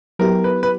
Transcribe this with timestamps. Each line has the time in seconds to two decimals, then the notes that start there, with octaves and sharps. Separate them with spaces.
0.19 F#3 B3 E4 G4 A#4
0.44 B4
0.63 B4